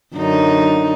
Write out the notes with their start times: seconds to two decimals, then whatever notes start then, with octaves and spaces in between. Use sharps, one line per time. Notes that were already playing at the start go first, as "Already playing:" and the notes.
0.16 F#2 D3 D#4